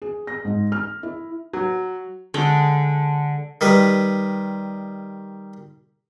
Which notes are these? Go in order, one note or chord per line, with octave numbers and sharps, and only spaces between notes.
G#4
A#6
G#2
F6
E4
F#3
D3 G#3 G5
D#3 G3 B4